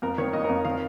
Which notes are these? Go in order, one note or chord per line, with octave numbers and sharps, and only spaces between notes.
F2 A#4
D#3 C#5
F2 D#5
A#4
F2
D#3 F5